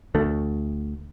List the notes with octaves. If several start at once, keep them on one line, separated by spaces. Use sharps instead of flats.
D2 A3